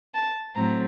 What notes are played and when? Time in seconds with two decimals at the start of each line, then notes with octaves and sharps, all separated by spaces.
0.15 A5
0.56 A2 F#3 A3 C4 A#5